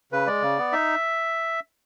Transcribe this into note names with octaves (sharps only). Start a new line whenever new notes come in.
C#3 B4
G#3 D5
C#3
B3
D#4 E5